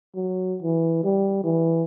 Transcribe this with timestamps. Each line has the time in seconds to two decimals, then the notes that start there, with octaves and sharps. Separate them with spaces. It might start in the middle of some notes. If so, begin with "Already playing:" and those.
0.16 F#3
0.62 E3
1.04 G3
1.44 E3